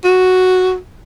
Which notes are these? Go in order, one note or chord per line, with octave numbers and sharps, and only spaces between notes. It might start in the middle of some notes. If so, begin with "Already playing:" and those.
F#4